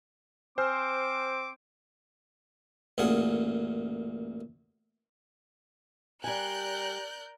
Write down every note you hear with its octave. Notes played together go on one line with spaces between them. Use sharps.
C4 C5 G#5 D6 F6
A1 F#2 A#2 G#4 F#5
G3 A#4 D5 G#5 F#6 G6